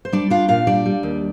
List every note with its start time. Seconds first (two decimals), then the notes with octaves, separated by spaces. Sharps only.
0.05 C5
0.13 G3 D4 D5
0.30 D4 F4 F5
0.48 A#2 F4 F5
0.67 G3 D4 D5
0.86 G3
1.03 D#2